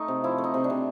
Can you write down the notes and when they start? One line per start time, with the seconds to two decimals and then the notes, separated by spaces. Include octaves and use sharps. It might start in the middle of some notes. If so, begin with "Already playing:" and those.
Already playing: A3 D#4
0.08 C3
0.24 F3 E4
0.38 A3
0.44 D#4
0.54 C3
0.64 D4
0.70 C3